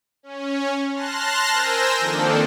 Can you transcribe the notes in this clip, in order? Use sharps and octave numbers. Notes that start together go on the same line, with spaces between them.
C#4
A5 C6 F6 F#6 A#6
A#4 C5 G#5 E6 G6 A#6
D#3 F3 A#3 C4 D4 A4